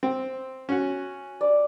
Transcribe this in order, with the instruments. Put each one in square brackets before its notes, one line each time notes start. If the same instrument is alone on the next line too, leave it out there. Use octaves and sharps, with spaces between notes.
[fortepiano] C4
C#4 F#4
[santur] D5